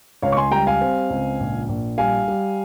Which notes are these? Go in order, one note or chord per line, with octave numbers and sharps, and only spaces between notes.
C#2 C#5 F5
C#6
G#5 C6
G3 G5 A#5
F5 G#5
C4
C#2
A#1
A#1
G3 F5 G#5
G3